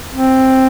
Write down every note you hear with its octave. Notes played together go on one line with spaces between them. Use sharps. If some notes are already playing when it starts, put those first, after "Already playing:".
C4